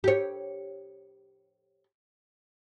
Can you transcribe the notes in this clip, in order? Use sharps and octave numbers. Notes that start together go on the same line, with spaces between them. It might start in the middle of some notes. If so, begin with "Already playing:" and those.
G4 C#5